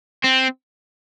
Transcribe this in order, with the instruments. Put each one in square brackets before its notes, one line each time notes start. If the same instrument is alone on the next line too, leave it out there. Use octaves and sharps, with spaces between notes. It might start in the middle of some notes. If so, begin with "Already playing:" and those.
[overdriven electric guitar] C4